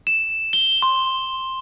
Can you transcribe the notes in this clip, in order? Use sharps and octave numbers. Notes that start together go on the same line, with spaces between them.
E7
G7
C6